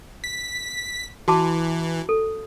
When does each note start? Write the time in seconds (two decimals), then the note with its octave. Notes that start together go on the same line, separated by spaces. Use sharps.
0.24 B6
1.28 E3 F#4 A5 D6
2.09 A4